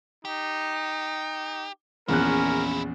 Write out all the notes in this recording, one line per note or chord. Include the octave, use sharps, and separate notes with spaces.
D#4 G4
A#1 E2 C#4 E4 F4 A#4 F#6